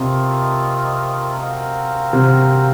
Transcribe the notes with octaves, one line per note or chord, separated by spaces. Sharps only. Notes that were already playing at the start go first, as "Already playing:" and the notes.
Already playing: C3 A3 C4 F4 A#4 D#5
C4 F#4 A#4 F5
C3